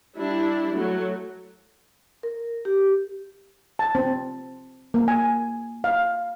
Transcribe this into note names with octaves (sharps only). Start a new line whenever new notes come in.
G3 D4 E4
F#3 A3
A#4
G4
A5
C4
A#3
G#5
F5